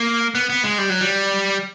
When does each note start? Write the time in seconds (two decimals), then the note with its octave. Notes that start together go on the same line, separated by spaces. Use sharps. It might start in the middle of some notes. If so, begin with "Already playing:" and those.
Already playing: A#3
0.35 B3
0.50 B3
0.64 G#3
0.78 G3
0.89 F#3
1.01 G3